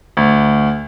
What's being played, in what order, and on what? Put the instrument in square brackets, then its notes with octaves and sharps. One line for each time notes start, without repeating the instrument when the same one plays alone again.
[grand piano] D2